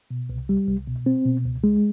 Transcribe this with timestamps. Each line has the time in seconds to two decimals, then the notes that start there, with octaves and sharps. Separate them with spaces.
0.11 B2
0.30 C2
0.49 G3
0.68 C2
0.88 B2
1.06 C4
1.25 B2
1.45 C#2
1.64 G#3